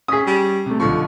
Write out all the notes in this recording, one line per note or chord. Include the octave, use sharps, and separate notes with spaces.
C#4 G#4 D#6 B6
G3
C3 A3
B1 D3 F3 C#6